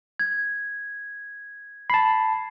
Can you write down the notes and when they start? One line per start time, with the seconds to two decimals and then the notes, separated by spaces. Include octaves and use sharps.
0.19 G#6
1.90 A5 B5 C7